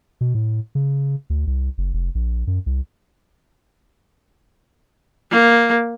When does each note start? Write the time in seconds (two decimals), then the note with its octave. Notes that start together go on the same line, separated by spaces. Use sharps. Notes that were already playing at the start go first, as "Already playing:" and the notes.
0.21 B2
0.35 A2
0.75 C#3
1.30 D2
1.47 C2
1.78 F#1
1.94 F1
2.15 A#1
2.47 F#2
2.66 C2
5.31 A#3